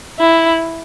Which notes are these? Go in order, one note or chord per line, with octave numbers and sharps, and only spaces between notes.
E4